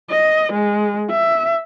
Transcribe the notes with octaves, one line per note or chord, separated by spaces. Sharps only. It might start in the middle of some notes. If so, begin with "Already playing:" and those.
D#5
G#3
E5